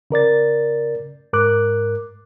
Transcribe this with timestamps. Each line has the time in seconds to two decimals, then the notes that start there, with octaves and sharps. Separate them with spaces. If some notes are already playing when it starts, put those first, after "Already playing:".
0.11 C#3 A#4 D5 A6
1.33 G#2 A#4 D6 F#6